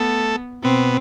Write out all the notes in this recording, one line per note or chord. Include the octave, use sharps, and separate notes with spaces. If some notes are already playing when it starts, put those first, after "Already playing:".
Already playing: A3 B3 A4
B2 B3 C4